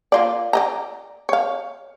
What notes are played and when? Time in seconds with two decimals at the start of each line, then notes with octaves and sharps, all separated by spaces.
0.12 A#3 F4 D5
0.53 D5 D#5 A#5
1.29 C#5 F5